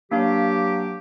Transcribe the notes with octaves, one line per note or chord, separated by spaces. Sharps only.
F#3 A#3 D4 G4 F5